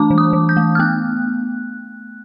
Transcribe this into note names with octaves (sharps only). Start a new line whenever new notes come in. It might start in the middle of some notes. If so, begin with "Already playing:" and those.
Already playing: E3 A3 D4 A5 D6
E3
D#6
E3
G6
A3
F6
B3 F#6